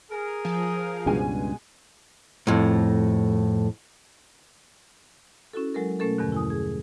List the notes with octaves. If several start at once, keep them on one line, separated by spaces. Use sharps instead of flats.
G#4 A#4
F3
C#2 G2 B2 G#3 G#5
F2 A2
C#4 E4 F#4 A4
F#3 G#3 A4 A#4
B2 A3 C#4 A4 A#4
E2 G2 B2 D3 F3
E4 G#5 D#6
G#4